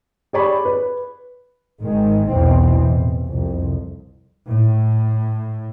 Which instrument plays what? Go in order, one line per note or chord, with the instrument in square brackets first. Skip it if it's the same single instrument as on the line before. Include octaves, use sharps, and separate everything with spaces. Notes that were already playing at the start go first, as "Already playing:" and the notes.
[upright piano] G4 G#4 C#5 D5 B5
B4
[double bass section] G#1 D#3 G#3
B1 E2 B2 E3 C4
A1
C2 F2
A2